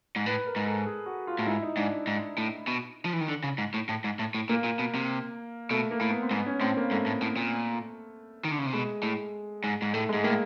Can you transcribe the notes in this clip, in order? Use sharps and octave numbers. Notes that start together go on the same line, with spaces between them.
G#2
A2 B4
A#4
G#2
A4
G#4
F#4
F4
A2
G#2 E4
D#4
G#2 D4
G#2
A2
B2
F3
E3
D#3
D3
C#3
G#2
A2
A2
G#2
A2
A2
A#2 A#3
A#2
B2
C3
B2 A3
A#3
A2
B3
C4
G#2 B3
C#4
A2 C4
A#3
G#2 A3
A2
A2
A#2
D#3
D3
C#3
C3
B2 G#3
A2
G#2
G#2
A2 A3
G#2 G#3
A2 A#3